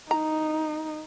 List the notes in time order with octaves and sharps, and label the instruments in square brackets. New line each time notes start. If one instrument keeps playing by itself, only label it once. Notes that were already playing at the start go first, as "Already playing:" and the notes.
[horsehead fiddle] D#4 [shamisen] A#5